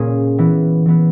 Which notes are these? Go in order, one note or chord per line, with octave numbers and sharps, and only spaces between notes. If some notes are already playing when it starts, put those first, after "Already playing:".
Already playing: A#2 A#3 C#4 G#4
E3 B3 E4
E3 B3 E4